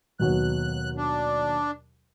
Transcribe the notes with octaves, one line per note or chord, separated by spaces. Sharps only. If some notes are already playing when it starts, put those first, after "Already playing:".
D#2 B2 F#3 F#6
D4